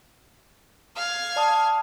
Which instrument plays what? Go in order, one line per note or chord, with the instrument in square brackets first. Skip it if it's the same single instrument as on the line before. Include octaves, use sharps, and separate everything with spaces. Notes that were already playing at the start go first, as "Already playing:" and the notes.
[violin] F5 G#6
[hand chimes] D5 A5 D#6